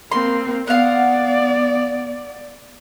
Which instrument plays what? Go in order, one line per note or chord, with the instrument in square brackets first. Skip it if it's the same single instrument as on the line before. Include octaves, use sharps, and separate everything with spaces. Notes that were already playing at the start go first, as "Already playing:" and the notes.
[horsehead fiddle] A#3 C4 [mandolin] C6
[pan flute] B3 [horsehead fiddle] D5 [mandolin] F5 F#5